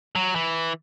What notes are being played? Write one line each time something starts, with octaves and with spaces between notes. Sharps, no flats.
F#3
E3